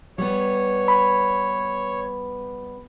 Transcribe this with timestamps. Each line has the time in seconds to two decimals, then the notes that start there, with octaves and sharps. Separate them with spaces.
0.18 G3 B3 C#5
0.88 B5